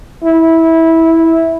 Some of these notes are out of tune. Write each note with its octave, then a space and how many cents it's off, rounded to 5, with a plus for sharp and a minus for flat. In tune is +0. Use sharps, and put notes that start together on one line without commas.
E4 -15